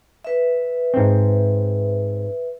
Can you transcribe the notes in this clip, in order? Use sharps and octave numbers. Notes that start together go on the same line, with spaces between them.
B4 E5
G#2 C4